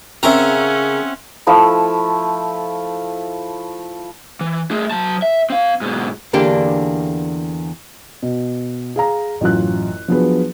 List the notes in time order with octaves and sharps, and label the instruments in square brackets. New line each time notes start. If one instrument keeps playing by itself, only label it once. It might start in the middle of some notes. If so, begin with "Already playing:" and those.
[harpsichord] C#3 A#4 A#5 [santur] C4 E5 [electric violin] C#4 F#5
[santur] F3 A3 E4
[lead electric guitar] E3
A3 G#4
F#3 A5
E5
C4 F5
G#2 B2
[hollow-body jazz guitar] E2 D3 A#3 D4 G4
[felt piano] B2
G#4 F5 A#5
A1 F#2 F4 F#6
F3 F#3 B3 D4 G#4 B4